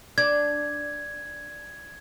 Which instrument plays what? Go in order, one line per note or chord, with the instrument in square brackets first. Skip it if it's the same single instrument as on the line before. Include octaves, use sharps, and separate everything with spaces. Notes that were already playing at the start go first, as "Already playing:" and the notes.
[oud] D4 [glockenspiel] G#6